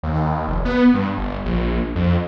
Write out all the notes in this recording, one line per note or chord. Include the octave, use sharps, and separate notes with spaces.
D#2
F1
B3
G2
G1
A#1
F2